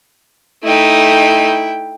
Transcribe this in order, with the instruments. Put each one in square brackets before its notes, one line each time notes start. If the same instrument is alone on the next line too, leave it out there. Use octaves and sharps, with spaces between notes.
[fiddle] A3 D#4 [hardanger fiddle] E4 G5